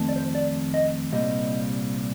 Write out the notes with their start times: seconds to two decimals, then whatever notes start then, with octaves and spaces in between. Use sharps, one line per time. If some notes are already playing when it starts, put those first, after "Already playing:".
Already playing: F2 D#3 A3 C4
0.09 D5
0.16 C5
0.35 D5
0.74 D#5
1.12 C2 A#2 G3 C4 D#5